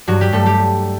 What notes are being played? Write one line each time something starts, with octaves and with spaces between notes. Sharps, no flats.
G2 F#3 F#4
G3 G4
G2 A3 A4
G3 G4